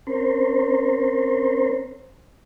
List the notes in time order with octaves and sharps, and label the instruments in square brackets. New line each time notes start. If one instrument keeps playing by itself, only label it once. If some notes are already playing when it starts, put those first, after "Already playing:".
[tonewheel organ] C4 C#4 A#4 C5